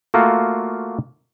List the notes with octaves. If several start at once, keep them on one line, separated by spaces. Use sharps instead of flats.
A3 A#3 F4 F#4